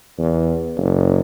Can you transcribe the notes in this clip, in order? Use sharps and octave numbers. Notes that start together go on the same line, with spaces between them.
E2
F#1